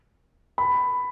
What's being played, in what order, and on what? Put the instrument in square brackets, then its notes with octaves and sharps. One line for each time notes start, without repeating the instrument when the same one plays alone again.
[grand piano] B5